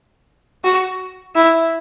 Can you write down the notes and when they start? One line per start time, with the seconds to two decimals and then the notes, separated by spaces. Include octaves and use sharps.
0.64 F#4
1.35 E4